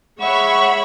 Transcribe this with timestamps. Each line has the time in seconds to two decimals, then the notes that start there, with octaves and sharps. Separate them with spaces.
0.21 G#3 C#5 E5 F#5 B5 C#6